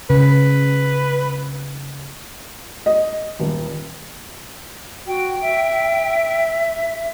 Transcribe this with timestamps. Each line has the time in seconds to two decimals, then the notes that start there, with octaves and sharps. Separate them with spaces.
0.10 C#3 B4
2.86 D#5
3.39 D#1
5.07 F#4 G5
5.41 E5